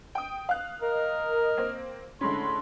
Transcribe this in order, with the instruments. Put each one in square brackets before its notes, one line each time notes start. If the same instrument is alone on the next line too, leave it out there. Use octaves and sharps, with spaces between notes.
[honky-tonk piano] G5 D#6
F5 F#6
[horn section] A#4 D#5
[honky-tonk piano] A#3 C4
[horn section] A2 B5 C6 [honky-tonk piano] D3 G#3 C#4